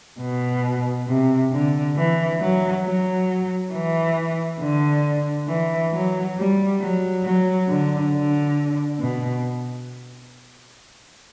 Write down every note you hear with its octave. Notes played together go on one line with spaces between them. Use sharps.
B2
C3
D3
E3
F#3
F#3
E3
D3
E3
F#3
G3
F#3
F#3
D3
D3
B2